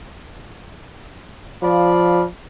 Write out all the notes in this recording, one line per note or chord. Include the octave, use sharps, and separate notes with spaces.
F3 D5 F5 B5